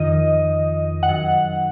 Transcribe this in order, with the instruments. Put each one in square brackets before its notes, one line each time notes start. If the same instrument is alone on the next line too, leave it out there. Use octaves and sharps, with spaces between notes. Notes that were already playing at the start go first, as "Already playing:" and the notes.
Already playing: [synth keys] F2 D#3 D#5
D#3 F#5
F#2